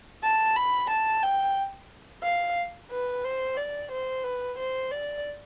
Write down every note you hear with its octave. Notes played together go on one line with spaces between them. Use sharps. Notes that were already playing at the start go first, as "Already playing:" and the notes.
A5
B5
A5
G5
F5
B4
C5
D5
C5
B4
C5
D5